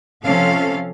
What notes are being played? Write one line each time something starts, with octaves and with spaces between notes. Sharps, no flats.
C3 F3 C#4 A4 F5